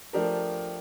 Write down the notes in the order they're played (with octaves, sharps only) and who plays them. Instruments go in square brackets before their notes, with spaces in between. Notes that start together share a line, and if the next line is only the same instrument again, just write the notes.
[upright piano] F3 A3 D4 G4 A#4